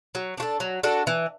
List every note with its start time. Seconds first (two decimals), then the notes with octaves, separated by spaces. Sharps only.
0.15 F#3
0.37 D4 F#4
0.42 A4
0.60 F#3
0.83 D4 F#4 A4
1.07 E3